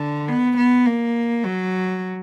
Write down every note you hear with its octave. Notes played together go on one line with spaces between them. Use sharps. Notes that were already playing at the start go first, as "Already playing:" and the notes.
Already playing: D3
B3
B3
A#3
F#3